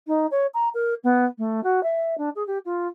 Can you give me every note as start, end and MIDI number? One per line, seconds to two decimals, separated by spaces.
0.07 0.26 63
0.31 0.46 73
0.54 0.69 82
0.74 0.94 70
1.03 1.25 59
1.38 1.63 57
1.63 1.83 66
1.83 2.14 76
2.18 2.29 62
2.35 2.45 68
2.47 2.58 67
2.65 2.87 65